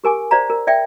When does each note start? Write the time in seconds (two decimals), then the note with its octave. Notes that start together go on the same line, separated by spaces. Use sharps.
0.04 G4 A#4 G#5 D6
0.31 C5 D5 F5 A#5
0.50 A#4
0.67 D5 E5 G5